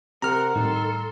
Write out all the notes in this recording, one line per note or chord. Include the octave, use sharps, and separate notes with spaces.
C3 A#4 F#5 A#5 F6
A2 D#3 G3 A4 C6